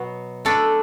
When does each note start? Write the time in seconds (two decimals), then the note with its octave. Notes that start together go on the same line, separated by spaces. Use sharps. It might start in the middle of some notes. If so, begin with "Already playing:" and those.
Already playing: B2 F#3 B3
0.45 A3 D4 A4 B4